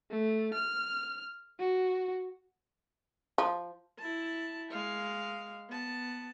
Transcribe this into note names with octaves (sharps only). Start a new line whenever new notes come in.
A3
F6
F#4
F3
E4 A5
G#3 F5
B3 A5